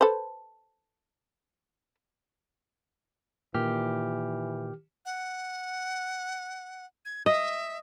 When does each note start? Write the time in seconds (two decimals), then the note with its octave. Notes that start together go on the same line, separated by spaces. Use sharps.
0.01 A4 B4 C5
3.54 A#2 D#3 E3 G4 F6
5.05 F#5
7.05 G#6
7.26 D#5 E5